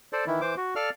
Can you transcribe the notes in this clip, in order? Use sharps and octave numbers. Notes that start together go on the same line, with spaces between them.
A4 C5 D5
D#3 E3 E4
E3 C5 D6
F#4
A4 D5 F5 F6